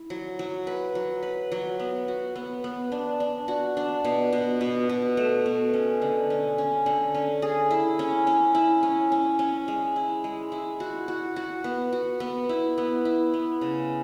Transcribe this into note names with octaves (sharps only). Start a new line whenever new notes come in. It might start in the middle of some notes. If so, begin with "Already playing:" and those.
Already playing: E4
F#3
F#3
B4
F#3
B4
F#3
B3
F#4
B3
B3
D4
D4
F#4
D4
B2
B2
B2
B2
A3
B2
C#4
D3
C#4
C#4
D3
C#4
G#4
E4
C#4
C#4
E4
C#4
C#4
C#4
G#3
E4
G#3
E4
F#4
F#4
F#4
B3
F#4
B3
E4
B3
E4
B3
C#3